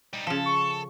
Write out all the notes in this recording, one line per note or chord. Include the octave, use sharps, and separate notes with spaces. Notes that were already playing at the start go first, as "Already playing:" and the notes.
G3 D#4
C#3 F3 A4
C#6